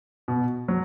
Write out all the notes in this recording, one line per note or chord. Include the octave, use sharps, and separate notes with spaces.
B2
F#3